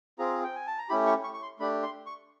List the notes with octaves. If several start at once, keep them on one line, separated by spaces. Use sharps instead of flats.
C4 F4 G#4 A#5
G5
G#5
A5
A#5
A3 C#4 E4 G4 B5
C#6
C#6
C#6
C6
A3 D4 G4 B5
C6
C#6